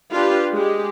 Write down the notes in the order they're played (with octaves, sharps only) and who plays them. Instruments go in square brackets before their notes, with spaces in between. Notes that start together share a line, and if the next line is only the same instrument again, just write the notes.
[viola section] D4 F4 G4 B4
G#3 G4